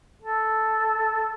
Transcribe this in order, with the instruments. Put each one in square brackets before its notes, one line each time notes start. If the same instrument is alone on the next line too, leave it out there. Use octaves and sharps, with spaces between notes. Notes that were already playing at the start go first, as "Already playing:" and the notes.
[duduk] A4